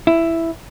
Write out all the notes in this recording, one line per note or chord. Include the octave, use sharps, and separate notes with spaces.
E4